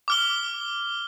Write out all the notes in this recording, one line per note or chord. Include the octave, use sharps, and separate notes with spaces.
D6 F6 G7